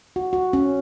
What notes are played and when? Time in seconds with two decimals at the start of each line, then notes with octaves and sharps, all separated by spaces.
0.16 F#4
0.33 F#4
0.53 C#4